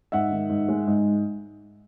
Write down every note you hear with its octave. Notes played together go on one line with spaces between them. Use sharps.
G#2 E5 F#5
D#3
G#2
G#3
G#2